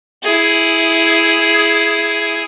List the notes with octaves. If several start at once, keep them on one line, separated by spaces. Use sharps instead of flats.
E4 G#4